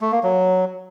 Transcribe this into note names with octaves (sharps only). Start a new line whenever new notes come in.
A3
A#3
F#3